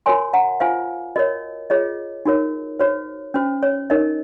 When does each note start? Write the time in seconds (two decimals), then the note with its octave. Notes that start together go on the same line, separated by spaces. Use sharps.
0.06 F#4 A#4 C#5 G#5 C6
0.33 F#5 A#5
0.60 F4 C5 F5 G#5
1.16 F#4 A#4 C#5 D#5
1.70 F4 G#4 C#5 D#5
2.26 D#4 F#4 A#4 C#5
2.79 F#4 C5 C#5
3.34 C#4 F#4 C5
3.63 C#5
3.90 D#4 A#4 C#5 D#5